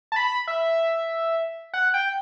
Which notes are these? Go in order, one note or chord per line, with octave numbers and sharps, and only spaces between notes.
A5
B5
E5
F#5
G5